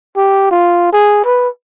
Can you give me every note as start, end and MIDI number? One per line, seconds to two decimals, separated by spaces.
0.17 0.48 67
0.51 0.88 65
0.93 1.22 68
1.25 1.48 71